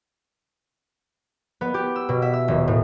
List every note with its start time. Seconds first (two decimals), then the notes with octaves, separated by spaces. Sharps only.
1.61 B3
1.74 G4
1.96 E6
2.09 B2
2.22 E5
2.33 E6
2.48 D#1
2.68 A2